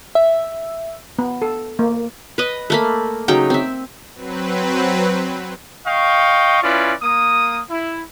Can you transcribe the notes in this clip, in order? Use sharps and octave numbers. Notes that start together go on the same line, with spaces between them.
E5
B3
A4
A#3
B4 D#5
A3 A#3 B5
C#3 F#3 D#4 G5
C4 E5
F#3 C4 B4
D#5 F5 G5 C#6
C#4 E4 F4 B4 D5
A#3 D#6
E4